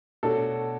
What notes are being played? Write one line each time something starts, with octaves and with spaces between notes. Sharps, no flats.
B2 A3 D4 F#4 A4 C#5